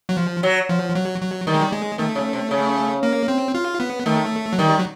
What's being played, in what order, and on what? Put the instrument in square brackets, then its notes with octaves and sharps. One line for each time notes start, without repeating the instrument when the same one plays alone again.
[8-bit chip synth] F#3
F3
[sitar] F#3
[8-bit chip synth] F3
F#3
F#3
[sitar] D#3 [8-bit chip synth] G3
[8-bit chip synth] G#3
G3
G#3
[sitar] D#3 [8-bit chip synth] A3
[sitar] C#3
C3
C#3
[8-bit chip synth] A#3
C4
F4
B3
[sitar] D#3 [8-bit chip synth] A3
[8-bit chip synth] F#3
[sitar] D#3 [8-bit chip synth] G3
[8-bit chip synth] F#3